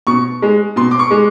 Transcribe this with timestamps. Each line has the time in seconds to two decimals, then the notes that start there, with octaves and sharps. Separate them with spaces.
0.07 B2 C#6
0.42 G#3
0.76 B2 C6
0.91 D6
0.99 C#6
1.11 G#3